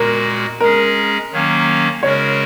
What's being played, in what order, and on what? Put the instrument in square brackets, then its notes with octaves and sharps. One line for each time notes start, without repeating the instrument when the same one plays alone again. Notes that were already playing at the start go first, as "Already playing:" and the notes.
Already playing: [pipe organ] A#2 G#3 F#4 [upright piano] A#4
[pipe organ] G#3 C#4 G#4 [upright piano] A#4
[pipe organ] D#3 F#3 A#3 C#4
[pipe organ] C#3 G#3 C#4 F#4 A#4 [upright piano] C#5